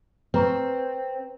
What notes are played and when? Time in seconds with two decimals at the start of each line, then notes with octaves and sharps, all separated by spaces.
0.34 C4 B4 A#5 C#6